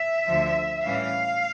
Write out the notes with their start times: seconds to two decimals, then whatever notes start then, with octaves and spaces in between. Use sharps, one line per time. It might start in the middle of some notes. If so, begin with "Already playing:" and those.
Already playing: E5
0.26 D2 D3 F3
0.84 A2 E3 G3 C#4 F5